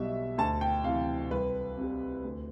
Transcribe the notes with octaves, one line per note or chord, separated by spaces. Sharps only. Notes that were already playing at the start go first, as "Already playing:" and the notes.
Already playing: B1 B2 G3 E5
D2 A5
G5
C3 E3 F5
C2 B4
C3 G3
D2